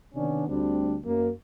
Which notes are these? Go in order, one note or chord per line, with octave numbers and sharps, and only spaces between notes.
C3 D#3 B3 C#4 D4
D2 G3 C4 D4
F#2 A#3